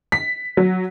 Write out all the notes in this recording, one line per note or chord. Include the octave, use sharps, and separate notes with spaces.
B6
F#3